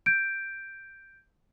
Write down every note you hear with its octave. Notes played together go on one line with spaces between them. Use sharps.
G6 D7